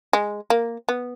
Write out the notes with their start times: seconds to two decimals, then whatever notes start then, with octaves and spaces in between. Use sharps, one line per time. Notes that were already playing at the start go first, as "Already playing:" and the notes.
0.13 G#3
0.50 A#3
0.89 B3